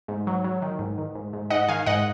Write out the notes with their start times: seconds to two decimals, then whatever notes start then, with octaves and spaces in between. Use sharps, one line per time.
0.08 G#2
0.27 F#3
0.44 F#3
0.62 D#3
0.79 G#2
0.98 D#3
1.15 G#2
1.33 G#2
1.50 G#2 D#5 F#5
1.68 D#3 F5 G#5
1.86 G#2 D#5 F#5